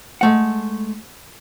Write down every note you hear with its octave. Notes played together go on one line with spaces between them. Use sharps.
G#3 A3 F#5